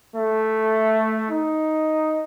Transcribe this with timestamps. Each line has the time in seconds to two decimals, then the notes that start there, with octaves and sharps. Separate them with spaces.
0.16 A3
1.30 D#4